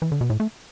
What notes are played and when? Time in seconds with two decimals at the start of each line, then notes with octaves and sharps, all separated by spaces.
0.02 E3
0.12 D3
0.21 B2
0.30 A2
0.40 A3